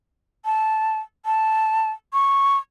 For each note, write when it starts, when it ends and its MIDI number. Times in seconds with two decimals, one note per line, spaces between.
0.45 0.99 81
1.26 1.91 81
2.13 2.57 85